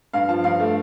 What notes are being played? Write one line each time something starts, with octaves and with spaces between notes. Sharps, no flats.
G2 F5
F3 A5
G2 F5
A3